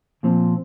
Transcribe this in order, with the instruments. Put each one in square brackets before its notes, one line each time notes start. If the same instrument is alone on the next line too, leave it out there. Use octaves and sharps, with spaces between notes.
[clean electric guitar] A#2 F3 C4